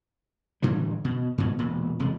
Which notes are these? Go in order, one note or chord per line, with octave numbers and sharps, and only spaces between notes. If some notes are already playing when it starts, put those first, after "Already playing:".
A2 D3 E3 G3
B2
G#2 B2
E1 A#2
E1 C3 G#3